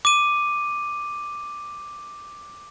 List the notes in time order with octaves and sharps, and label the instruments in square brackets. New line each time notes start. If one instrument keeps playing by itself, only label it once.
[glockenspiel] D6 D#7